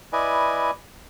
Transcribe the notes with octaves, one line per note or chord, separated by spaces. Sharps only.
E4 B4 D5 D#5 G#5